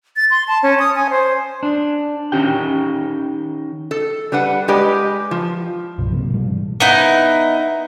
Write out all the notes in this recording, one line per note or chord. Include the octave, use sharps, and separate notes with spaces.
A6
C6
A5
C#4
D#6
G#5
C5
D4
D#3 C#4 G4 G5
A4
G3 D4 B4 F#5
G#3 G4 B4 D5
F3
C2 G2 B2 F3
C3 F#3 A#3
G#2 B2 G3
E3 D4
B3 D#4 E4